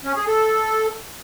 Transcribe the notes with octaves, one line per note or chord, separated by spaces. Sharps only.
C#4
G#4
A4